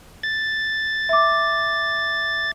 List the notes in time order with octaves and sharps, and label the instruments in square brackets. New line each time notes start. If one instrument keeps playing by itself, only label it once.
[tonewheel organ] A6
[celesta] E5 D6